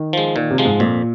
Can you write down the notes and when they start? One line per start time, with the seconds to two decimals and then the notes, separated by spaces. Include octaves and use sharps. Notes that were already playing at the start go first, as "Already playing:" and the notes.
Already playing: D#3
0.13 F3 G#3
0.36 A#2 D#3
0.51 C3
0.58 F3 G#3
0.65 G#2
0.80 F2 A#2